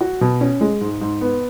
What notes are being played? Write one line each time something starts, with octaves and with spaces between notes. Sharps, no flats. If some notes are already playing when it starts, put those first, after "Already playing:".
F#4
B2
C#4
G#3
G#2
G#2
B3